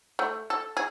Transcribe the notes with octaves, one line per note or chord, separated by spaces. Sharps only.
A3
A4
G#4